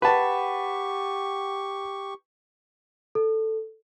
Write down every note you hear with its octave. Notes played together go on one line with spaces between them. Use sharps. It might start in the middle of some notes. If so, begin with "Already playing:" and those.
G4 B4 F#5 G5 A5 B5 C#6
A4